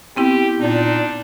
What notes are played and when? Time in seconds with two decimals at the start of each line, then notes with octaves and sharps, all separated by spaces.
0.16 B3 C4 E4 G4
0.60 A#2 D4 D#4